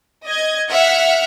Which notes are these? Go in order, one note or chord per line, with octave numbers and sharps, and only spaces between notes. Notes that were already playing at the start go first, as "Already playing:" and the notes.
D#5 G#6
E5 F#5 F6